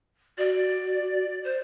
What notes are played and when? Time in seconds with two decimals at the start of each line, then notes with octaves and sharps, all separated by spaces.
0.38 F#4 D5
1.44 C5